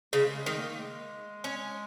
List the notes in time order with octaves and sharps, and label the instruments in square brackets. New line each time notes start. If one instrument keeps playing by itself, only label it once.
[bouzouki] C#3 [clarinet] G#3
[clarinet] G#3
[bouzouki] D#3 [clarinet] G#3
[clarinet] A#3
G#3
[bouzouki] C#4